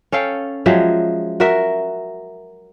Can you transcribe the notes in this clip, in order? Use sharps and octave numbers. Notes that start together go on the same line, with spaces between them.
C#4 A4 F5 G5
F3 F#3 G#3 E5
F#4 A#4 E5